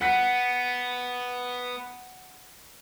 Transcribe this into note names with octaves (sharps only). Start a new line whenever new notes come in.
B3 F#5 B6